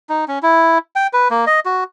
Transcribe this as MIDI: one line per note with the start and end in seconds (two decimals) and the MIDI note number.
0.09 0.25 63
0.28 0.39 61
0.43 0.78 64
0.96 1.07 79
1.13 1.28 71
1.31 1.45 58
1.47 1.60 75
1.65 1.84 66